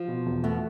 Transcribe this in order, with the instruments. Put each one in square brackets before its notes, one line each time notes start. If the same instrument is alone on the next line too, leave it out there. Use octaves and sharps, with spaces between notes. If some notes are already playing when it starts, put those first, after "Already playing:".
Already playing: [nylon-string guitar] F3 F4
[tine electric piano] B2
E2
[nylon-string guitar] B2 B3 [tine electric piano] A3